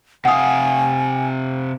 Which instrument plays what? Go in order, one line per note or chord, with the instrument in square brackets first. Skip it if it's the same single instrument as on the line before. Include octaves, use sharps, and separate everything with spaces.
[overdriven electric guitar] C3 F5 [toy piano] F#5 D#6 [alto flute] G#5